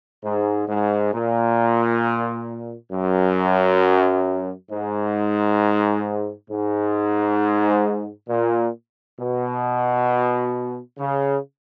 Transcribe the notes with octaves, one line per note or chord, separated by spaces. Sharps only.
G#2
G#2
A#2
F#2
G#2
G#2
A#2
B2
C#3